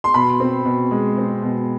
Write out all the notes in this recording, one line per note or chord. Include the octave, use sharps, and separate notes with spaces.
C6
B2 B5
C4
B2
G#3
C4
B2